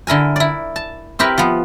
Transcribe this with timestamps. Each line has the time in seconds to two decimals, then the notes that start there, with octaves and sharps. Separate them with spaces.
0.07 D3 E4 A#4 G#5
0.36 E4 D5
0.76 A5
1.19 C4 E4 G4 A#4 B4
1.38 F3 B3